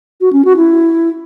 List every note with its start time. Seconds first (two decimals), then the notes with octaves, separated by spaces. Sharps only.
0.21 F#4
0.33 C#4
0.45 F#4
0.57 E4